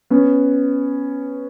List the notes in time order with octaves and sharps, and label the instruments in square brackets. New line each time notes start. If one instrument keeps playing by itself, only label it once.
[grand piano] B3 C#4